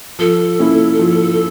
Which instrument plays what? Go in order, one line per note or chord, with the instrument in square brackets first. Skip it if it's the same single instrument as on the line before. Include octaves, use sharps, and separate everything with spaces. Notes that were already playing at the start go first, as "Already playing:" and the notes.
[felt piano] F3 [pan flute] A4
[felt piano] A#3 C#4 E4
F3